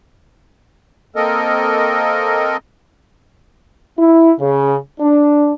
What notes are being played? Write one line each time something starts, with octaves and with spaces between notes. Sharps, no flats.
A#3 C4 A4 A#4 D#5
E4
C#3
D4